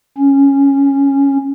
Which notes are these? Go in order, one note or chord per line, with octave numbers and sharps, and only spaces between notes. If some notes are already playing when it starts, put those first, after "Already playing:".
C#4